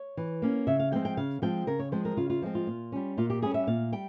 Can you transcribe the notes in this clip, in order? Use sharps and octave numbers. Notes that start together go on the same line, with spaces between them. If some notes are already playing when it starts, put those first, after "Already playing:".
Already playing: C#5
E3
A#3 C#4
C#3 E5
F5
F3 G#3 C4 G5
G5
C#3 F5
F3 G#3 C4 G5
C#3 A#4
C#5
F3 G#3 C4 C5
A#4
C#3 F4
F4
F3 G#3 C4
F4
A#2
G3 C#4
A#2 F4
G4
G3 C#4 G#4
E5
A#2 F5
G3 G5